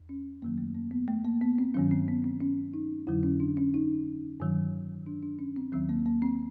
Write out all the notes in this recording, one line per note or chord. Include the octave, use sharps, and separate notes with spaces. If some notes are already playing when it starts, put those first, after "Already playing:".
Already playing: E2
C#4
F#2 D#3 F#3 A#3
A3
A#3
B3
A3
A#3
B3
C4
G2 D#3 F#3 C#4
C4
B3
C4
C#4
D#4
F2 D3 F#3 E4
C#4
D4
C#4
D#4
G2 D#3 F#3
D4
D4
C#4
C4
D#2 D#3 F#3 C4
A#3
A#3
C4